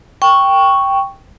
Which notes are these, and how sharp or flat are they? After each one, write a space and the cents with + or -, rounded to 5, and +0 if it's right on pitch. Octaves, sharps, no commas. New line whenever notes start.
G5 +0 C#6 +0